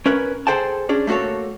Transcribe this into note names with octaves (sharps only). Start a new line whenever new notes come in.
C#4 A#4 B4
G#4 A4 C5 G5 A5
C#4 D4 G#4
A3 A#3 F#4 A4 C#5